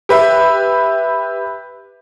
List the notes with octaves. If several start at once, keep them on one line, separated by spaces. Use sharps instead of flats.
G4 B4 E5